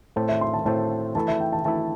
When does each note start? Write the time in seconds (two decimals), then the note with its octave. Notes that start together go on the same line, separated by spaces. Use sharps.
0.16 A2 A3 C4 A4 C5
0.29 E5
0.41 C6
0.54 A5
0.65 A2 A3 C4 A4 C5 A5
1.15 E3 A3 E4 A4 A5
1.28 E5
1.40 G5
1.53 A5
1.65 E3 A3 E4 A4 A5